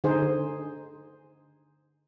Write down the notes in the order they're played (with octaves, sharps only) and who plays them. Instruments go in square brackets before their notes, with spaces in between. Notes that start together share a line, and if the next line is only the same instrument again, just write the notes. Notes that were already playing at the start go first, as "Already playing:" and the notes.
[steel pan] D3 D#4 G#4 C5